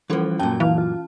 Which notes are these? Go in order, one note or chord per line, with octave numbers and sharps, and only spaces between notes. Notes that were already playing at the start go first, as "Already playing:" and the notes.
E3 F3 G3 C#4 A4
F#2 A#2 C#4 G5 A5
E3 F5
F4